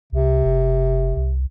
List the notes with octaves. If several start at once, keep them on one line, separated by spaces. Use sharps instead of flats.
C2 C3
F#1
C2